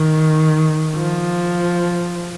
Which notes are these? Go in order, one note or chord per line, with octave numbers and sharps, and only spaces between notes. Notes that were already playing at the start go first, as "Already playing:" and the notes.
Already playing: D#3
F3